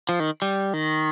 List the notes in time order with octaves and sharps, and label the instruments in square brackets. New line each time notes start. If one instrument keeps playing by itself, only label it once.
[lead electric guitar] F3
D#3
G3
D#3